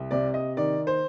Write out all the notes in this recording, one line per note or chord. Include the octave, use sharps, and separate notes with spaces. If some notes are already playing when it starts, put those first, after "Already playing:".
Already playing: C2
C3 D5
D#5
D#3 D5
C5